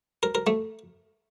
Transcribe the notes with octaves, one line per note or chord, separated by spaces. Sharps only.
A#4
A#4
A3